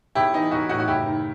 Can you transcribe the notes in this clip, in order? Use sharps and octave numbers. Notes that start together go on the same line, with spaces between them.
B1 E4 G4
E3 D#4
B1 D#4 F#4
A2 D#4 F#4
F#4
F#1 E4 G4
D#3